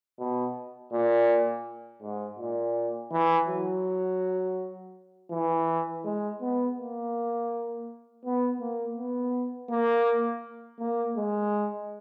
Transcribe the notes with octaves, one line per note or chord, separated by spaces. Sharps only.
B2
A#2
G#2
A#2
E3
F#3
E3
G#3
B3
A#3
B3
A#3
B3
A#3
A#3
G#3